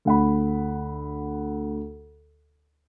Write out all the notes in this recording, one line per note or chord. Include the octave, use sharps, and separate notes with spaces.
D2 F#5 B5